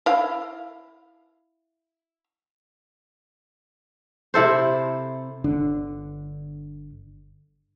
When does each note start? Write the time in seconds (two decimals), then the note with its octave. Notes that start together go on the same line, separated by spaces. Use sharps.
0.06 E4 F5
4.34 C3 E4 A4 C5
5.44 G1 D3 D4